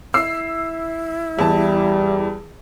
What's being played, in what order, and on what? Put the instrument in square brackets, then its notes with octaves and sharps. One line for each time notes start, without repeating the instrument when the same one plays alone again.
[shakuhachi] E4 [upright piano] E6 C7
[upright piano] E2 A5 [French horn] G3